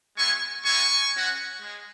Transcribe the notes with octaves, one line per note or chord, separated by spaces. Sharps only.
G#3 B3 E4 G#5 C#6
G#3 B3 E4 G#5 C#6
G#3 C#4 F#4
G#3